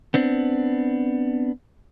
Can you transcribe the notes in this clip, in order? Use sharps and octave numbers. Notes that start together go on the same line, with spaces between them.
B3 C4 D4